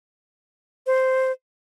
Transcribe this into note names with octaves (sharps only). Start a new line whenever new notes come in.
C5